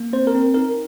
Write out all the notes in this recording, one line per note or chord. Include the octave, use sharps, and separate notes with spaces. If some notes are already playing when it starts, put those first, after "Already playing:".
Already playing: A#3
C4 C5
A#4
C4
D#4 A#4